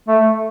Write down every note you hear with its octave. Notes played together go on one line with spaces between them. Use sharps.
A3